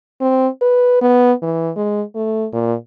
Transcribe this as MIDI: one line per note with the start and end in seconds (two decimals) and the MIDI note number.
0.21 0.48 60
0.62 0.99 71
1.02 1.32 59
1.42 1.70 52
1.76 2.02 56
2.15 2.47 57
2.53 2.74 46